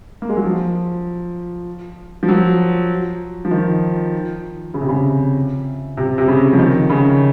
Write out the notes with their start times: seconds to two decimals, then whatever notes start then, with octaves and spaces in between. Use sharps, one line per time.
0.22 A#3
0.29 G#3
0.37 F#3
0.44 F3
2.23 F3
2.28 F#3
3.45 F3
3.51 D#3
4.74 C#3
4.81 C3
4.88 C#3
5.97 C3
6.18 C3
6.28 C#3
6.53 F3
6.59 D#3
6.89 C#3